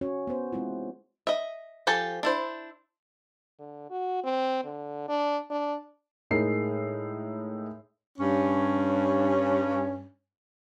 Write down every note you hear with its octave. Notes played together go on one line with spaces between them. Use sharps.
C#4 F#4 C#5
B3 C5
G#3 C4 E4 F4
D#5 E5
F3 G4 A4 G#5
D4 E4 C5
D3
F#4
C4
D3
D4
D4
A2 G#3 D#4 A#4 C7
G2 C#4